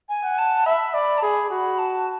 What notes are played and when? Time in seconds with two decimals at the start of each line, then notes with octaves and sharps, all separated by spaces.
0.09 G#5
0.23 F#5
0.38 A5
0.66 E5 B5
0.94 D5 B5
1.18 A5
1.22 G#4 B5
1.50 F#4 B5
1.78 A5